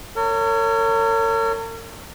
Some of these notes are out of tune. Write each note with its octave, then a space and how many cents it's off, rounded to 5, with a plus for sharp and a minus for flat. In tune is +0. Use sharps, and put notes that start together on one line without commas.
A#4 -45 C#5 +10